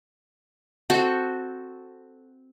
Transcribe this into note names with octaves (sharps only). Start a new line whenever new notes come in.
C4 F#4 A4